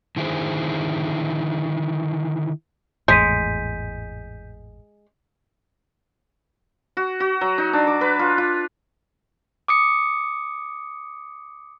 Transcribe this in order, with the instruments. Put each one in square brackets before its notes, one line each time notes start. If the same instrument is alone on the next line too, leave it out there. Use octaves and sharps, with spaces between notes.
[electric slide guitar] D3 D#3 E4 G#4 C5
[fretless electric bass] G#1 E2 A2 [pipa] G#3 [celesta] G6 B6 D#7
[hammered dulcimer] F#4
F#4
F#3
D#4
D4
D6
B4
F4
F4
[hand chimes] D6 D#6 C#7